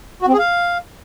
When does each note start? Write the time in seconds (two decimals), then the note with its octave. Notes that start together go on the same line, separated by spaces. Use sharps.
0.22 F#4
0.28 C4
0.33 G#4
0.39 F5